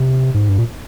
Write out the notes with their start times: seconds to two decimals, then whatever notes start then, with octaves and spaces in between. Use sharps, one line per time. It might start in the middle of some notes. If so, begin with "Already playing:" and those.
Already playing: C3
0.34 G#2
0.49 G2
0.58 A#2